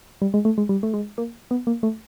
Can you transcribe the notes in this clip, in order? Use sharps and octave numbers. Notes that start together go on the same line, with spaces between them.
G3
G#3
A3
G#3
G3
A3
G#3
A#3
B3
A#3
A3